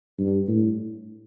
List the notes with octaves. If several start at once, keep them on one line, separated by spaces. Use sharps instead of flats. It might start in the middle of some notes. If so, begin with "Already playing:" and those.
G2
A2